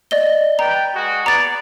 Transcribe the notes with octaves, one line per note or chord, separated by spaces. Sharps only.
D5 D#5 G7
B4 D5 G5 A#5
G#3 F#4
B3 G#4 D5 A#5 A6